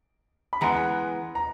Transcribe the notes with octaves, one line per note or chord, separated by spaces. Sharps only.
B5
E3 G#3 B3 A#5
A#5